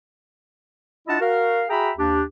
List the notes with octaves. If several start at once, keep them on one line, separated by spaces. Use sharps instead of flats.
D4 E4 F4 D#5 F#5 A5
F#4 A#4 F5
F#4 G#4 E5 G5 A#5 B5
D#2 D4 G4